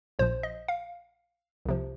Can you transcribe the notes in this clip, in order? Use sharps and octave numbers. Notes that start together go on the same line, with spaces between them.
A#1 A#2 F3 C5
D#5
F5
C2 C3 F3